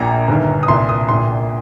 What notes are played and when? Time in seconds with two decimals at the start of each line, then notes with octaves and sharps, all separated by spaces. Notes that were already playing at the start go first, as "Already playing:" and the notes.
Already playing: A#1 A#2 A#5
0.28 G1 G2 D#3
0.63 D#6
0.68 C2 A#2 C6
0.89 D#6
1.09 A#1 A#2 C6